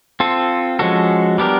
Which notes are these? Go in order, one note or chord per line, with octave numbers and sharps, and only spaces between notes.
C4 F4 A4
F3 G#3 C#4 F#4 A4
G3 B3 D4 G4 A#4